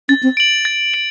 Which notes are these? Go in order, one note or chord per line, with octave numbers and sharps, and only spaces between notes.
C#4 A6
C4
D7 F#7
A6
D7 F#7